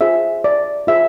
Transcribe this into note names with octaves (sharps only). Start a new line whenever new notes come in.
F4 G#4 C5 E5
D5
F4 G#4 C5 E5